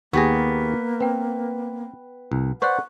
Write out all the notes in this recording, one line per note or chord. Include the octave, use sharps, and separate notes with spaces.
D#2 A#3 B3 G4 G#4 C#6 A#6
C4 B4 G5
C2
B4 C5 D5 F#5 C#6 F#6